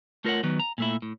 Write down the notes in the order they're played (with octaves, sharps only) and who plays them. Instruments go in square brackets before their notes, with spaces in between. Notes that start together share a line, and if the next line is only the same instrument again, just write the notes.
[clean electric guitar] A3 F4 A#4 C5 C#5 F#5
D#3 F#3 B3
A#5
A#2 A3 E4
A2